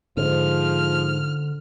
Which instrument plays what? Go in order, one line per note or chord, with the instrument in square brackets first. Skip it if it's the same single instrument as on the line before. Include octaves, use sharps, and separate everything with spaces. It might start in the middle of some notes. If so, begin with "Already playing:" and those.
[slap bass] G#2 [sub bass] D3 [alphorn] F3 [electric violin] F6